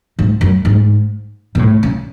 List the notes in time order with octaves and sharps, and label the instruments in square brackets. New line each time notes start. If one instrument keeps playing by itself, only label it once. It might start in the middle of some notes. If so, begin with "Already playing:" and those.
[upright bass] G#2
F#2
G#2
B2
A2
C#3